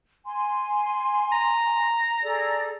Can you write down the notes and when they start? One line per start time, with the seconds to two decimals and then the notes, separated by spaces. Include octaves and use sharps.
0.25 G#5 C6
1.32 A#5
2.23 G#4 A4 D5